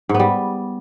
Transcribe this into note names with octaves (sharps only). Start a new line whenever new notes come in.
G#2
B3
G3